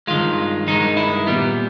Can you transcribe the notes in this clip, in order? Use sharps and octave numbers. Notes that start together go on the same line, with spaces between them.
G2 D#3 G#3 F4
G2 D#3 G#3 D#4
E4
A#2 G3 B3